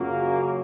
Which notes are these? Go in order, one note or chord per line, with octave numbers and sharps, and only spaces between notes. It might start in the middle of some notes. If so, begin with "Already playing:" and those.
Already playing: F#2 C#3 F#3 A#3 F4